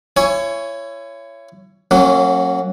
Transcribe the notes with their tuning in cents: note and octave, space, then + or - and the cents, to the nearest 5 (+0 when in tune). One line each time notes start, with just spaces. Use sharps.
E4 +35 C#5 +10 G#5 +0
F#3 +0 A#3 -35 C#4 -30